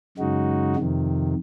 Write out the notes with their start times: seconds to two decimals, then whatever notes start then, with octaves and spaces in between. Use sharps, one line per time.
0.17 F#2 C#3 G#3 D#4 F#4
0.76 F2 C3 D#3